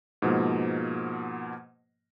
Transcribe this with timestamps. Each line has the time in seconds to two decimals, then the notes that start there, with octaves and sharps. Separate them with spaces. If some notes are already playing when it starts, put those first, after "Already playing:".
0.22 G#2 B2 F3 A#3